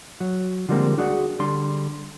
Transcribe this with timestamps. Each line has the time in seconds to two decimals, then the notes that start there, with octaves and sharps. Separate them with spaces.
0.20 F#3
0.69 D3 F3 G3 G#3 A#3 C4
0.98 D4 F#4 G#4 D5 E5 F#5
1.39 D3 G3 D4 C6